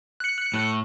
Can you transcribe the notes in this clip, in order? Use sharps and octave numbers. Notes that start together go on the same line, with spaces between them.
F#6 C#7
A2